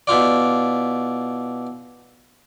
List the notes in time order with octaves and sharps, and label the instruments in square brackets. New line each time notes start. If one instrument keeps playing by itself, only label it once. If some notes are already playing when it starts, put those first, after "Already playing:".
[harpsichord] B2 E4 F4 D5